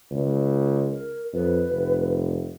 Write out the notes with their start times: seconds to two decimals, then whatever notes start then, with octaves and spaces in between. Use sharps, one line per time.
0.11 C#2
0.92 A#4
1.33 F2 B4
1.70 F1